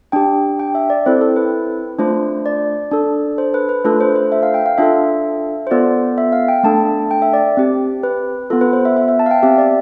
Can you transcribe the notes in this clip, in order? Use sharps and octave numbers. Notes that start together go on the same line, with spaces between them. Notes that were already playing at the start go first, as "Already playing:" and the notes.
D4 G4 G5
G5
E5
D5
C4 E4 A4 C5
A4
B4
A3 D4 F4 C5
D5
D4 A4
C5
B4
B4
A3 D4 F4 A4 B4
C5
C5
E5
F5
G5
F5
D4 F4 A4 E5
C5
B3 F4 A4 D5
E5
F5
G5
A3 D4 A4 A5
G5
E5
D5
C4 G4
B4
B3 F4 A4
B4
C5
E5
E5
E5
A5
F5
G5
C4 G4 E5
D5